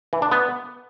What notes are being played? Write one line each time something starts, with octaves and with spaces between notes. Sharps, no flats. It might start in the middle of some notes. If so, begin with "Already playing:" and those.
E3
D4
B3